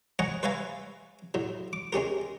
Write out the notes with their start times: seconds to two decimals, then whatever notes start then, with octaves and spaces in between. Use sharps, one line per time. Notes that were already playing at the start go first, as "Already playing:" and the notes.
0.19 C#5 D#5 F#5 G#5 A#5
0.43 B4 C#5 E5 F5 G#5 A#5
1.34 A2 F#3
1.73 D6
1.93 G#3 C#4 G4 A#4